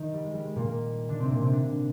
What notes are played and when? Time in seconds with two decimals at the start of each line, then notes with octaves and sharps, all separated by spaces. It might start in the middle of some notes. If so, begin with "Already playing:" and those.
Already playing: D#3 D#4
0.13 G3
0.24 G#3
0.34 G3
0.45 G#3
0.56 A#2 A#3
0.66 A#2 A#3
1.09 D3 D4
1.20 C3 C4
1.30 A#2 A#3
1.41 C3 C4
1.51 D3 D4